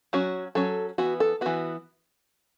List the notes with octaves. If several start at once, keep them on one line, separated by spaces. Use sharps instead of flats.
F#3 C#4 F#4
F#3 C#4 A4
E3 B3 F#4
A4
E3 B3 F#4